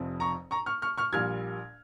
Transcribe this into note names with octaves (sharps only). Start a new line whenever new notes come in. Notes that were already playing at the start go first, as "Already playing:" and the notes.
Already playing: F1 F2 C3 F3
A#5 C#6
A#5 C#6
C#6 F6
C#6 F6
C#6 F6
A#1 A#2 G3 F6 G#6